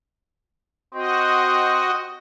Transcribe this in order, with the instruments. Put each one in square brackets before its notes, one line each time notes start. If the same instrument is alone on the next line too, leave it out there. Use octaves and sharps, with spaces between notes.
[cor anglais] C4 [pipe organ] F#4 D#5